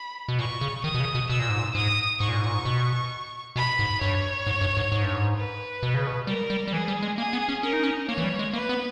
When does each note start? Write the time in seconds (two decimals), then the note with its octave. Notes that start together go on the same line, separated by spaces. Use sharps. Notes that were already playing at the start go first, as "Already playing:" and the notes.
Already playing: B5
0.28 B2
0.39 A#2 C#6
0.61 C#3
0.84 D#3 D#6
0.94 B2
1.00 C#3
1.15 B2
1.29 B2 E6
1.39 A#2
1.49 G#2
1.59 A#2
1.75 G#2 D#6
2.20 G#2 C#6
2.29 A#2
2.37 G#2
2.46 A#2
2.54 G#2
2.65 B2
3.56 B2 B5
3.79 G#2
4.01 G2 C#5
4.47 G#2
4.61 G2
4.77 G#2
4.92 G#2
5.03 G2
5.14 G#2
5.37 B4
5.83 B2
5.94 C#3
6.07 B2
6.27 G3 A#4
6.50 G3
6.68 G3
6.73 E3 G#4
6.88 G3
7.02 G#3
7.18 A#3 G#4
7.33 B3
7.49 C#4
7.63 C#4 A#4
7.73 D#4
7.83 C#4
8.08 A#3 C#5
8.18 E3
8.24 G3
8.39 G#3
8.53 A#3 B4
8.69 B3